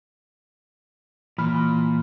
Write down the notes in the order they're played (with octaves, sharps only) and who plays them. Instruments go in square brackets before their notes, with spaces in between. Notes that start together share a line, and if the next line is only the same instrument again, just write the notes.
[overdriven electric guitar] A#2 [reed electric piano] E3 B5 F6